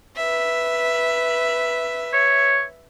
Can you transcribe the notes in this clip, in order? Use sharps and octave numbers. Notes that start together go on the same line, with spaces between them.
B4 E5
C#5